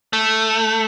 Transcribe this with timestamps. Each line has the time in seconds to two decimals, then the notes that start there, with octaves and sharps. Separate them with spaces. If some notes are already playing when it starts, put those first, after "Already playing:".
0.13 A3